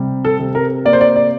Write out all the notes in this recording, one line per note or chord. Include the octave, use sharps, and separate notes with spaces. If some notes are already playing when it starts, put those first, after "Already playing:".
Already playing: C3 G3
A4
C3
A#4
A#3 D5
C5
D5
D5